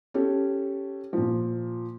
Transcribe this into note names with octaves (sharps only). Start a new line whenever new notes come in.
C#4 G4 A4
A#2 F3